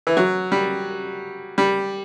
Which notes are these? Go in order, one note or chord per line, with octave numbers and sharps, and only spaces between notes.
E3
F#3
G3
G3